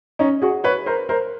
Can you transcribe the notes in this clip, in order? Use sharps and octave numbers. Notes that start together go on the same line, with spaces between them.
C#4 D#4
F#4 G#4
B4 C#5
A#4 C5
A#4 C5